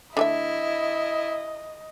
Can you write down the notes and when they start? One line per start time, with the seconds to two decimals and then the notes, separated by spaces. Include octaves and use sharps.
0.17 D3 A3 E4 D#5 E5